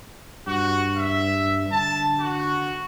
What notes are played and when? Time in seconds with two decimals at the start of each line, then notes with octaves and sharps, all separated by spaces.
0.47 G2 F#4
0.97 E5
1.72 D3 A5
2.21 F#4